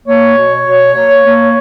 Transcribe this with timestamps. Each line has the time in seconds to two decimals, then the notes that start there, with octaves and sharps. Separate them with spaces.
0.07 A#3 C#5
0.36 B2
0.65 B2
0.95 A#3
1.25 A#3